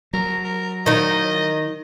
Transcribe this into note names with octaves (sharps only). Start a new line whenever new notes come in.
F#3 A#4
A#4
D#3 D#4 D#5